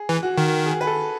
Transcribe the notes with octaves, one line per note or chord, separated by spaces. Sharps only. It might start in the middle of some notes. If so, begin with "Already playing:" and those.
Already playing: G#4
E3
F#4
D#3
G#4
B4
A4